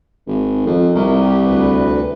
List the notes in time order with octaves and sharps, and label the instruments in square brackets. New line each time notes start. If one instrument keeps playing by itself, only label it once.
[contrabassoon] G#1
F2
[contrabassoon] C2 [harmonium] A#4
[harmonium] G4
D2 B4